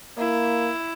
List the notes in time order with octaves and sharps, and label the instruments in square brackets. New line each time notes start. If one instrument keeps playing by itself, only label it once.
[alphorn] A#3 [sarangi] E4